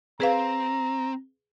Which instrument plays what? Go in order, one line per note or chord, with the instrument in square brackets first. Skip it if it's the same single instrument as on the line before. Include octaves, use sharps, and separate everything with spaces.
[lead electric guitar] C4 [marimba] G#4 B4 F5 [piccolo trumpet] A#5